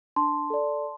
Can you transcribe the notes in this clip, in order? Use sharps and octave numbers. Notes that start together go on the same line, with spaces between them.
D4 A5 C6
A4 D5